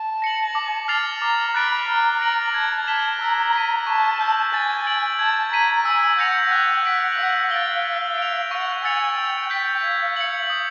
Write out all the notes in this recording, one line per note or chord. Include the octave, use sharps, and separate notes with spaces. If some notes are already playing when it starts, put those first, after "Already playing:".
Already playing: A5
A#6 C#7 F#7
D6
F6 A6 C7 F7
A#5 D6
B5 F#6 A6 D7
A#5 F6
A#6 D7 F#7
A5 G#6
A5 B6 E7 G7
A#5 E6
G#6 B6 D#7
A5 C#6
E6 G6
G#5 A6
D7 F#7
A5 G#6
A#5 B6 D#7
G#5 E6
F#5 G6 A#6 C#7 F7
G5 F#6
F#5 B6 D7 F#7
F#5 E6
F5 A6 D7 G7
A6
D7 F7
F#5 C#6
G#5 E6 A6 C#7 F7
G5 E6
G6 B6
F5 G#6
C#7 F#7
D#6